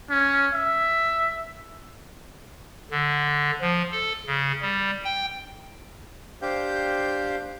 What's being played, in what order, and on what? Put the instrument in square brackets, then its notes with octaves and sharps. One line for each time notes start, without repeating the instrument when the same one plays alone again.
[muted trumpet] C#4
E5
[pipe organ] D3
F3
A4
C#3
G3
G5
[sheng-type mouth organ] D4 G4 C5 F5 G5 G6